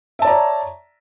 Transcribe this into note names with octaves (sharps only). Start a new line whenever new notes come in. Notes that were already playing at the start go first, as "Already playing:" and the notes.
C#5 D5 E5 A5 A#5